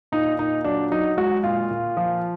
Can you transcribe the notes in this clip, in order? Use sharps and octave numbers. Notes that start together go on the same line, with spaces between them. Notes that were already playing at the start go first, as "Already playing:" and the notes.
A#2 D#4
A#2 D#4
F#3 D4
F#3 D#4
G#3 F#4
A#2 F4
A#2
F3